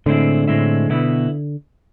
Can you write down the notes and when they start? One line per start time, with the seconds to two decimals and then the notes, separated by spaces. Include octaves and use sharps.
0.06 A2 D3 G#3 C4 E4
0.47 A2 G#3 C4 E4
0.89 B2 B3 E4